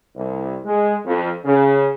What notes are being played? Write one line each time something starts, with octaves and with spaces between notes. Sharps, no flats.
C2
G#3
F2
C#3